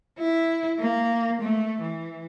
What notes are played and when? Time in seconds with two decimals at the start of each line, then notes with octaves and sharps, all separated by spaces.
0.18 E4
0.79 A#3
1.41 A3
1.81 E3